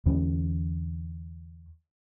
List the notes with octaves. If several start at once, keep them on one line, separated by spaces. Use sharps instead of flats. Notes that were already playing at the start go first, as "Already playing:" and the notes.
E2 D3 C#4